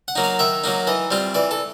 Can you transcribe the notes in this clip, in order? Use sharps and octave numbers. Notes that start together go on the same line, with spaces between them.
F#5
F#3 A#3 D#4
F5
D#3 E5
F#3 A#3 D#4
E3 D#5
G3 C4 F4
E3 D5
A4